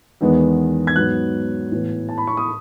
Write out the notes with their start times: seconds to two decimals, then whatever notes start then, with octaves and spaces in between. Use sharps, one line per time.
0.21 E2 D#3 G#3 B3
0.87 G#6
0.96 G#2 F#3 B3 F#6
1.72 A2 E3 B3
2.09 A5
2.18 B5
2.27 C#6
2.37 D#6